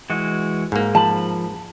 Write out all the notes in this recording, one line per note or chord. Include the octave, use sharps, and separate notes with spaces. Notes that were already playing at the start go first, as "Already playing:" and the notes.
E3 G#3 F#4
G#2 A#3
F3 A5 B5